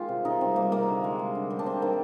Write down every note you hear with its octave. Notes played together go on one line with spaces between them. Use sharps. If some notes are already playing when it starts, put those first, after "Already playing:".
Already playing: D#3 G#3 F4 G4
C3
C3 D#4
G3 C4
G3 A#3
C3 A#3
D3
G#3
G#3
D3
G3 C4
D4
C3 C4
D#3 A#3